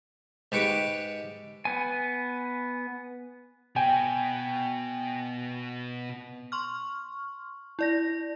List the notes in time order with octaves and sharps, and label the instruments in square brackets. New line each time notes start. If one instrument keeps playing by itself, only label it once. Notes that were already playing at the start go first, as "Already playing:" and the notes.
[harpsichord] G#2 G4 B4 C#6 D6
[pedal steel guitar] B3 G#5
[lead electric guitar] B2 B3 [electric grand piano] G5 G#5
[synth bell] C6 C#6 F6
E4 D5 A#6